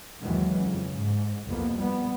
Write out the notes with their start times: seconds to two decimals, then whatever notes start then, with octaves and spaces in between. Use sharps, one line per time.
0.22 D#2 D#3 E3 F#3 G#3
0.60 F2 C#3
0.93 G#2
1.48 C2 F2 C3 A#3 B3
1.76 G3 B3